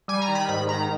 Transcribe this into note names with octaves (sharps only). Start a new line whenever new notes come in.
G3 G#5
A#5
D#3
B5
G#2 B5
D#3 A#5